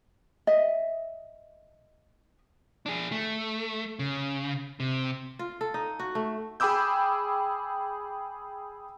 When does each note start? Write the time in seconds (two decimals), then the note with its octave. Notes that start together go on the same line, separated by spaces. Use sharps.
0.47 D#5 E5
2.86 D4 G#4
3.12 A3
3.99 C#3
4.80 C3
5.39 F4
5.61 A4
5.74 D#4
5.99 F#4
6.15 A3
6.60 G#4 G5 B5 D6 E6 G6